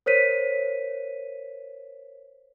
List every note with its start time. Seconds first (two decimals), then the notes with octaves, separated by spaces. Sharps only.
0.06 A#4 C5 C#5 B6 D#7